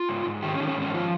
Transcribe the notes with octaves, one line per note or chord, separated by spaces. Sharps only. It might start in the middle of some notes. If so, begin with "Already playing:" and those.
Already playing: F4
G#2
G#2
D#3 G4
C#4
D#3
C#4
G#2
C#4
F3 F4